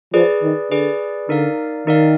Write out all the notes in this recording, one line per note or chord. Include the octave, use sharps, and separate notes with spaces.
F3 G#4 B4 D5
D#3
D3 G#4 B4 D5
D3 D#4 A#4 D5 F5
D#3 D#4 A#4 D5 F5